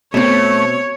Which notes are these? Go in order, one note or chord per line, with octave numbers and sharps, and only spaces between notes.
B2 A3 C4 C#5